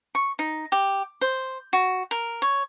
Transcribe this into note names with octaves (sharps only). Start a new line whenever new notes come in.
C#6
D#4
G4
C5
F#4
A#4
C#5